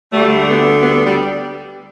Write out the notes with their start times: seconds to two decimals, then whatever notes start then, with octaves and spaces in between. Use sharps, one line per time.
0.13 D2 D3 G3 A3
0.38 A3
0.47 G3 B3
0.81 G3 B3
1.05 G3